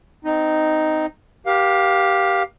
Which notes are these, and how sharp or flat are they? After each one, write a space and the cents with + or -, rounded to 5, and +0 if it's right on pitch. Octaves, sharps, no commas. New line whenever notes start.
C4 -25 D#4 +0
G4 +0 A#4 +40 F5 +15